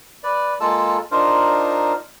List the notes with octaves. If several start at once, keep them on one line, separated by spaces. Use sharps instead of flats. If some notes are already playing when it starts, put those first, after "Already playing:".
B4 D5
G#3 A#3 F4 A4 A5 E6
D4 D#4 F4 A#4 C5